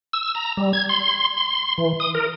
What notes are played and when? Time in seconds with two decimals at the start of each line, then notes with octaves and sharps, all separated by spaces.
0.13 E6
0.35 A#5
0.57 G3
0.73 G#6
0.89 C6
1.38 C6
1.78 E3
2.00 D#6
2.15 A#4